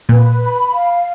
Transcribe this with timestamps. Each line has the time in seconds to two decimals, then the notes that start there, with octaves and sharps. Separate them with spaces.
0.09 A#2 B4
0.41 B5
0.74 F5